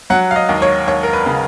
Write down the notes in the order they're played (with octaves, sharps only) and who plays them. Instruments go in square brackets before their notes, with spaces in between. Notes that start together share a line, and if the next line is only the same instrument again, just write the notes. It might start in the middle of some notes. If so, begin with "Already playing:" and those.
[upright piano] F#3 F#5
F5
D#5
D#2
C#5
D#2 C#5
A#4
B4
C#3